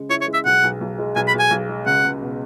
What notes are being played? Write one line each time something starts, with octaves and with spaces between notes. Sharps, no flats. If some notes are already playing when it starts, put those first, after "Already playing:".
Already playing: C#3 G#3
E4 C#5
C#5
G#3
E5
B1 F#5
B1
B1
G#3
B1 G#5
B5
B1
G#5
B1
G#3
C#2 F#5
C#2
B2